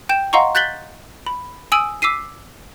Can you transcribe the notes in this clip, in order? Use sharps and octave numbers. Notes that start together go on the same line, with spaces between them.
G5 G6 E7
D#5 F5 F#5 A#5 C6 C#6
F#6 G6 A6 B6 F#7 G7
B5
G#5 D#6 E6 D7 F#7
D6 E6 B6 C7 D#7